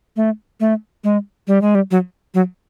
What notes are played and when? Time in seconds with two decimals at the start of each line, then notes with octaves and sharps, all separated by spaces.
0.16 A3
0.60 A3
1.04 G#3
1.47 G3
1.62 G#3
1.75 G3
1.91 F#3
2.34 F#3